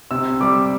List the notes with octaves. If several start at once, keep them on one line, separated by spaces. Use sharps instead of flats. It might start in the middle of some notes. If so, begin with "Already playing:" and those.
C3 E6
G3 D6